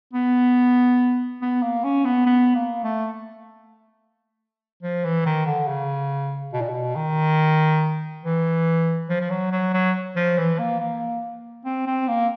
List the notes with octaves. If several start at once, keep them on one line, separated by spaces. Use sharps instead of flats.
B3
B3
A#3
C#4
B3
B3
A#3
A3
F3
E3
D#3
D3
C#3
B2
A#2
B2
D#3
E3
F3
F3
F#3
F#3
F#3
F3
E3
A#3
A#3
C4
C4
A#3